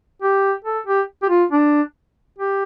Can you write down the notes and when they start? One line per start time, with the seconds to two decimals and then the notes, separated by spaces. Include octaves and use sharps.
0.22 G4
0.64 A4
0.86 G4
1.23 G4
1.29 F4
1.52 D4
2.38 G4